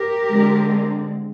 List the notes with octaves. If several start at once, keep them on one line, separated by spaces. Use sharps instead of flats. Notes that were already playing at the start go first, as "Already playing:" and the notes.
Already playing: G4 A#4
D3 G#3 C4